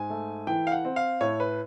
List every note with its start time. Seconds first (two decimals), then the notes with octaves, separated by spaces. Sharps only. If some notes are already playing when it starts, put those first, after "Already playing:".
Already playing: G#2 G#5
0.10 A3
0.47 E3 G5
0.67 F5
0.72 F#5
0.85 C4
0.96 F5
1.21 A2 C#5
1.40 B4